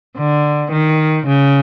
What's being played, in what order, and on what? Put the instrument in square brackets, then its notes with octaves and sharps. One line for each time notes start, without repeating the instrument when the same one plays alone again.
[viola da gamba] D3
D#3
C#3